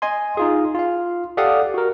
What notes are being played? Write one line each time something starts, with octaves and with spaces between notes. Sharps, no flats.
D#5 G#5 C6
D#4 F4 G#4
F4 F5
G4 A4 D5 F5 F#5 D#6
F#4 A#4